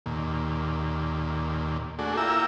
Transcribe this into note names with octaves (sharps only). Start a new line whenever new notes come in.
D#2 A#2
A3 D4 F#4 G#4
A#3 E4 F4 G5 A#5 E6